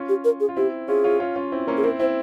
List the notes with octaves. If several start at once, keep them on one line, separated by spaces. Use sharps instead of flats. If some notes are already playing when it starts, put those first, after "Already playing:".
Already playing: C#4 F4
G4
A#4
G#4
F4
C4 E4 G4
C#4 F4 G#4
C#4 F4
C#4 F4
C#4 F4
C4 E4
A#3 C#4
G#4
C4 E4 A#4
C4 E4 C5